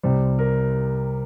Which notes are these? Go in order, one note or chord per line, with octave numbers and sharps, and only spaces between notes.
C2 C3 G3 C5
A#4